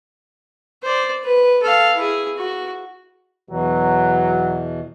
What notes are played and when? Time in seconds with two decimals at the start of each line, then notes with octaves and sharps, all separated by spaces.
0.83 C5 D5
1.24 B4
1.62 A4 F5
1.97 E4 G#4
2.37 F#4
3.50 E2 B2 E3 F#3